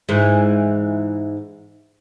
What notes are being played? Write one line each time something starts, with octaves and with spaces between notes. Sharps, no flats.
G#2 E3